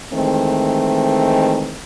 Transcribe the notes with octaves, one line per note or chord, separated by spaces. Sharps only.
D#3 E3 G#3 A3 C4